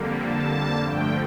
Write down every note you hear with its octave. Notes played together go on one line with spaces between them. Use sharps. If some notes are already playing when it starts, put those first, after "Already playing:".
Already playing: F2 D3 G3 A#3
A5
G2 D3 F3 A3 G5